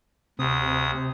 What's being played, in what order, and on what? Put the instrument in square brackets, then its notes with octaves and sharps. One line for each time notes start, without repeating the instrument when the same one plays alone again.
[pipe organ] D2 D#6 [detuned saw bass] C3